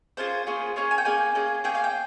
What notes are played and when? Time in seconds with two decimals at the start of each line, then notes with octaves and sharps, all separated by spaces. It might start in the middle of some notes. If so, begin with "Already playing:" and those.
0.17 A#3 C#4 F4 G#4 C5
0.47 A#3 C#4 F4 G#4
0.76 A#3 C#4 G#4 C#5
0.91 G#5
0.98 G5
1.05 A#3 C#4 G#4 G#5
1.35 A#3 C#4 G#4
1.64 A#3 C#4 G#4 G5
1.75 F5
1.84 G5